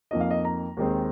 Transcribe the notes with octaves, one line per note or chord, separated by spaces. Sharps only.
F2 F3 A#3 D#4 D#5
F5
D#5
A#5
D#2 D#3 G#3 C4